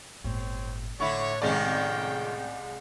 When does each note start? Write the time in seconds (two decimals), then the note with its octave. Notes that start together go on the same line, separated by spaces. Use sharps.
0.24 G1 A2 C4 C#5
1.00 A2 D3 E4 C#5 C#6
1.42 C2 F2 D#3 G#3 C#4 D5 G5